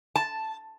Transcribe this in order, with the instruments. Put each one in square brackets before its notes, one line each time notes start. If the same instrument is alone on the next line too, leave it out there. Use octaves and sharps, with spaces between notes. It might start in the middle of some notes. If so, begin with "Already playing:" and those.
[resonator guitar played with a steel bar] A5